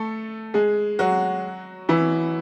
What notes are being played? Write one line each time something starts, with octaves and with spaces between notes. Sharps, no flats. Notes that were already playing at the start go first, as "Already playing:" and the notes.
Already playing: A3 A4
G#3 G#4
F#3 F#4
E3 E4